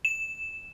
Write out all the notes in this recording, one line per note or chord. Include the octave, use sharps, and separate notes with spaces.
E7